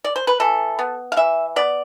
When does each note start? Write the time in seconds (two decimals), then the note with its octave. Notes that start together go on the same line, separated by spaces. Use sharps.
0.04 D5
0.16 C5
0.27 B4
0.40 E3 A4
0.79 B3
1.12 F5
1.16 E3 E5
1.56 B3 D5